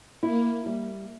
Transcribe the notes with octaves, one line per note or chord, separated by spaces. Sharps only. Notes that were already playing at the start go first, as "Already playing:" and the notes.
A#3 E4
G3